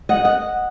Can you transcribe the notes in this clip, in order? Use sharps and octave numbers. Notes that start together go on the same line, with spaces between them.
D#5 F#5
D#5 F#5